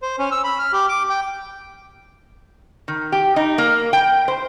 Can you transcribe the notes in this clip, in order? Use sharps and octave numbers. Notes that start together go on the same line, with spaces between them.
C5
C#4
E6
B5
F6
G4
D6
G5
D#3
G4
D#4
A#3
G5
C5